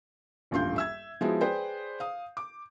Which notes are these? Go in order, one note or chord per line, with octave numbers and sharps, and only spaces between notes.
D#1 A1 G2 F4 C6 G6
E5 E6 G#6
F3 G#3 B3 E4 F#4 G#4
G#4 B4 C5 D5 G5
F5 D#6
D6